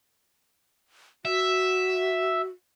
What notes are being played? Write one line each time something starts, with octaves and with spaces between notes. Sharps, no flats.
F#4 E5